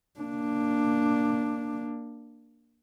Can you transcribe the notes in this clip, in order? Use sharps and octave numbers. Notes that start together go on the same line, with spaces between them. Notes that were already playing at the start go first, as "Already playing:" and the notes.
A#3 D4